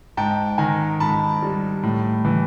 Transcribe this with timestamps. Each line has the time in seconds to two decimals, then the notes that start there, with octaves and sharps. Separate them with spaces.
0.17 G#2 G5 A5
0.58 D#3 G#5 A#5
1.00 G#2 A5 B5
1.42 G3
1.83 A2
2.25 E3